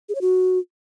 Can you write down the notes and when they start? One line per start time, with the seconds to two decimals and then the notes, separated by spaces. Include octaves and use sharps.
0.09 G#4
0.15 C#5
0.21 F#4